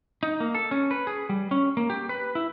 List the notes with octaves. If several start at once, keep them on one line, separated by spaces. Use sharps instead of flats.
D#4
A#3
A4
C#4
B4
G#4
G3
C#4
A#3
G4
B4
E4